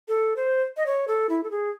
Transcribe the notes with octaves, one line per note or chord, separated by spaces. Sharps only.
A4
C5
D#5
C#5
A4
E4
A4
G#4